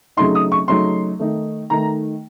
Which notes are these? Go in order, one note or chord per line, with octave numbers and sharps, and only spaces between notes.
C#3 F#3 A3 D#4 C6
D#6
C#6
C#3 F#3 A3 D#4 C6
D#3 A3 D#4
D#3 A3 D#4 A#5